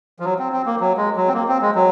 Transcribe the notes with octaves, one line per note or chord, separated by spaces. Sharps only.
F3
F#3
C4
C4
A#3
F#3
G#3
F#3
C4
A#3
C4
G#3
F#3